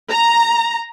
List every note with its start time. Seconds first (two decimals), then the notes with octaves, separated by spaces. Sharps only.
0.12 A#5